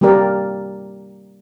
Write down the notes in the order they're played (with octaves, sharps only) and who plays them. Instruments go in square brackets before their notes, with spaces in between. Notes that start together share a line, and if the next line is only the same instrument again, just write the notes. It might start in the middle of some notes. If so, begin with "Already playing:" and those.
[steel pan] G3 A#3 G4 A#4 D5